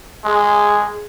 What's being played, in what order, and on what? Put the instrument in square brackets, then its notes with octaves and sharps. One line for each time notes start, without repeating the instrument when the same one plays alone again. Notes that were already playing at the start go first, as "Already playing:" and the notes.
[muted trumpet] G#3 [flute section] G#4